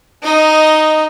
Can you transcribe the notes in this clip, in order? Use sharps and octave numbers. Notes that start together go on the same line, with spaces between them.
D#4 D#5